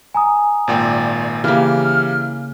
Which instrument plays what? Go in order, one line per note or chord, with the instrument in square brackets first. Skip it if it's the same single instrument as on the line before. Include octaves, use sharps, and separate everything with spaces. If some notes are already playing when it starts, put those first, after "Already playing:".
[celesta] G#5 A#5 D#6
[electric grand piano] G#1 A#2 G5 [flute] D5
[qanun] C#3 A#3 [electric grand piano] E3 G4 [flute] F6